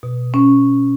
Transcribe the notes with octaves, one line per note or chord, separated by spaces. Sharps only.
B2
C#4